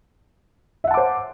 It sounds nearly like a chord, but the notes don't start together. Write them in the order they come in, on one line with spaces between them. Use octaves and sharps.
E5 F#5 A5 D6 C5